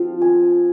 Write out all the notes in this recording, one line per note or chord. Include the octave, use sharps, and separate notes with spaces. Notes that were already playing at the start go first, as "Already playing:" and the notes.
Already playing: F3 C4 F4
G#5